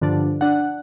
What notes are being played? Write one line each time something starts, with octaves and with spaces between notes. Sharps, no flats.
G2 D3 F3 D4
D4 F#5